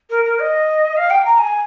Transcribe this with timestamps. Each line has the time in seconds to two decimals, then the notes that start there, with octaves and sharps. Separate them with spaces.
0.10 A#4
0.24 A#4
0.39 D#5
0.96 F5
1.10 G5
1.24 A#5
1.38 G#5